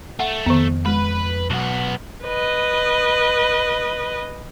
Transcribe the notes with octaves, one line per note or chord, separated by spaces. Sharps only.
A3 F#5
F2 D#3 B3
G#3 B4
B1 B2 B3
B4 D#5